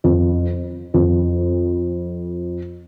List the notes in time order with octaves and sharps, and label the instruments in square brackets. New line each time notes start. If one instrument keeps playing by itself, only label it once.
[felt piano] F2
F2